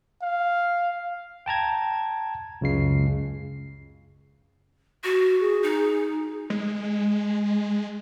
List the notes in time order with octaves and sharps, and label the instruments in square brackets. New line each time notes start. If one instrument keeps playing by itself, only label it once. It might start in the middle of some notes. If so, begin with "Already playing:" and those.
[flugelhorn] F5
[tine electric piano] G5 A5 A#5 G#6
C#2 F#2 C#3 G#3 C7
[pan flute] F#4
[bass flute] G#4
[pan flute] D#4
[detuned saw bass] G#3